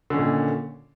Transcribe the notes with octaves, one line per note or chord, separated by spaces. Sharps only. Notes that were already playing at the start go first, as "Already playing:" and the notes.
A#2 D3 D#3 C#4